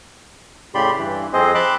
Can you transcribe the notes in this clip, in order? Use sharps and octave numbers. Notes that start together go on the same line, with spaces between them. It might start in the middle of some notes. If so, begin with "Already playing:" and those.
A2 C#3 G4 D5 B5 C6
G2 E3
F2 C4 G#4 C5 D#5
A5 B5 C6 D6 F#6